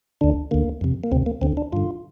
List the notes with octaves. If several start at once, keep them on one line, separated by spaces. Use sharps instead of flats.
D2 D3 D4
D2 D3 A#3
F2 C3
A#3
D2 C3 C4
A#3
D2 D3 C4
D4
G2 D3 F4